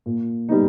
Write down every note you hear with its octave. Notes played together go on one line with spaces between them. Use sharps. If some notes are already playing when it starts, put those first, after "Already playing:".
A#2
G3 B3 D#4